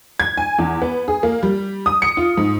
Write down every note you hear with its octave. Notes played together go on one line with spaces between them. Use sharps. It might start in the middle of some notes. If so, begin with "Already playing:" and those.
G#6
G#5
E2
B3
G#4
A#3
G3
D#6
C#7
F4
G#2